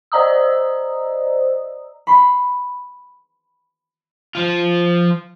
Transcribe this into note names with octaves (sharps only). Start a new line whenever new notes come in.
C5 D5 D#5 A#5 D#6 E6
B5 C6
F3 F4